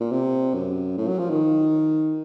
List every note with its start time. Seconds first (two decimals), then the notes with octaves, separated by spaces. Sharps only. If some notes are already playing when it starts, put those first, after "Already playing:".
0.01 A#2
0.12 C3
0.54 F#2
0.97 A2
1.08 F#3
1.19 F3
1.30 D#3